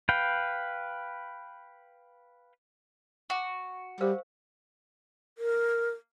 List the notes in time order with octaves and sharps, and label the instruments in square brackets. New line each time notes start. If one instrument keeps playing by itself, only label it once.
[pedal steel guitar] B4 F5 G5
[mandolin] F#4
[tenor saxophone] G3 [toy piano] A#4 C5 F5
[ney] A#4